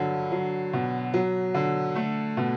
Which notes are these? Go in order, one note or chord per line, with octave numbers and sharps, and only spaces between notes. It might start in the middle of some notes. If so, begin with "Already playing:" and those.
Already playing: G2 D3 F#3
F#3
B2
F#3
D3
A3
B2